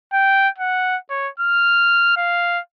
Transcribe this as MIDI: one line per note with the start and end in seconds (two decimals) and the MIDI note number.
0.13 0.49 79
0.58 0.97 78
1.10 1.29 73
1.40 2.16 89
2.17 2.60 77